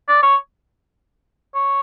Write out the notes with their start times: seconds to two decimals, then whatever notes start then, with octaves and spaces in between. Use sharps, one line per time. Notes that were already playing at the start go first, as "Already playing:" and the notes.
0.08 D5
0.23 C#5
1.55 C#5